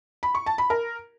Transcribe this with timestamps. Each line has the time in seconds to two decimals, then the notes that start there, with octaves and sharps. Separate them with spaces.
0.23 B5
0.35 C#6
0.46 A5
0.58 B5
0.70 A#4